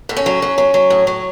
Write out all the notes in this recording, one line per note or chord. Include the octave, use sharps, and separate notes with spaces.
A2
C#4
F#3
F#3
F#3
F#3
A2
F#3